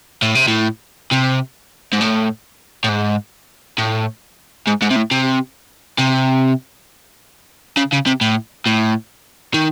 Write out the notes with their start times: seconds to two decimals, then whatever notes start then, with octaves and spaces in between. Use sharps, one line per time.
0.22 A2
0.35 C3
0.48 A2
1.12 C3
1.93 G#2
2.01 A2
2.84 A2
2.89 G#2
3.78 A2
4.67 G#2
4.82 G#2
4.90 C3
4.96 A2
5.11 C3
5.99 C3
7.77 C#3
7.92 C#3
8.06 C3
8.21 A2
8.67 A2
9.54 D#3